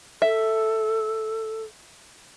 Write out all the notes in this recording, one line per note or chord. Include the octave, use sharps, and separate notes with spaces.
A4 E5